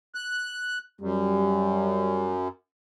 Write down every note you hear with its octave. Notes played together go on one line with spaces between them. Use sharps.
F#6
F#2 G3